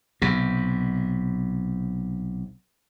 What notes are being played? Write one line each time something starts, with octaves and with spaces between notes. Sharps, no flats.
B1 C3